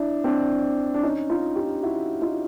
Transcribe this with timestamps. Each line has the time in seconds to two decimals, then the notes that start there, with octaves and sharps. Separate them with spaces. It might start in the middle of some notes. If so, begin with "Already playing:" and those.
Already playing: D4 E4
0.24 C4 D4
0.94 D4
1.03 C#4 D#4
1.30 D#4 F4
1.56 F4 G4
1.83 E4 F#4
2.21 D#4 F4